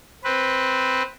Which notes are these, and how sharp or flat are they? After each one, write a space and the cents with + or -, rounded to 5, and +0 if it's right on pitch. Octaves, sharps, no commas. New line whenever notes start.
C4 +0 B4 +0